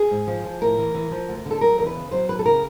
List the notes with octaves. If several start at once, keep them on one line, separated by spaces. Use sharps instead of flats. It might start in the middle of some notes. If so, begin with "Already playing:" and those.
Already playing: G#4
G#2
F3
F3
A2 A#4
E3
E3
F3
D2
D3
A4
F#3 A#4
E2 A#4
B4
C#3
F#3 C5
F#2 B4
A4
C#3 A#4